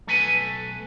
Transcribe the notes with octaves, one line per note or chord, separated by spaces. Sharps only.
B1 A3 A4 B4 G#5